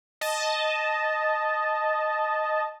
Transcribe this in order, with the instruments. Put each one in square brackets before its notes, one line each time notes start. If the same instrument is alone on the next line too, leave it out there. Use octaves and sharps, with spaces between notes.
[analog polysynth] D#5 A5